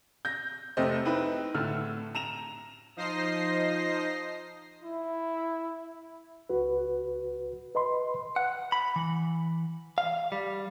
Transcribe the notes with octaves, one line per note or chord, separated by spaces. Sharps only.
G6 A#6
F1 C3 A3 G4 C5 D#5
C4 D#4 E4 B4
A2 D3 A3 E6 F6
A#5 E7 F7
F3 D#4 C5 D#5 A#6 C7
E4
C#2 F#4 B4
B4 D#5 B5 C6
F#5
B5
E3
F5
G3